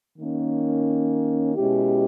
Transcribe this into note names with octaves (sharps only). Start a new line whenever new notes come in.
D#3 A#3 C#4
B2 G#3 C#4 E4 G4